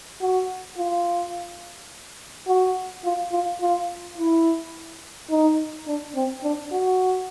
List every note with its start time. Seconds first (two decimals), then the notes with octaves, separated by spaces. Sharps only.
0.21 F#4
0.78 F4
2.47 F#4
3.05 F4
3.32 F4
3.61 F4
4.18 E4
5.30 D#4
5.87 D4
6.15 C4
6.44 D4
6.72 F#4